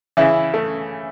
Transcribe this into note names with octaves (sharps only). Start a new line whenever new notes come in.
C#3 E3 E4
A3